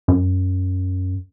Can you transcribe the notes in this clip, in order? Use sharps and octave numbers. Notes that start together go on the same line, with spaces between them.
F#2